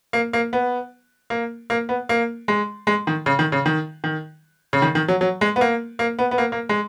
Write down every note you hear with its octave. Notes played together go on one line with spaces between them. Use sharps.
A#3
A#3
B3
A#3
A#3
B3
A#3
G#3
G#3
D#3
C#3
D#3
C#3
D#3
D#3
C#3
D#3
D#3
F#3
F#3
G#3
B3
A#3
A#3
B3
B3
A#3
A#3
G#3